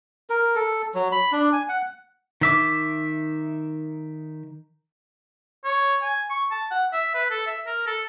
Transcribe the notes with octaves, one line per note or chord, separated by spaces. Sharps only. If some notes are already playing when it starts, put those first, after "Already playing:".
A#4
A4
F#3
B5
D4
G#5
F#5
D#3 E5 D6
C#5
G#5
C#6
A5
F#5
E5
B4
A4
E5
A#4
A4